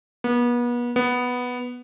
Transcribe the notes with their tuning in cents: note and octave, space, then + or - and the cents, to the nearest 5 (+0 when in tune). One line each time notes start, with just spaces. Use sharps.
B3 -35
B3 +0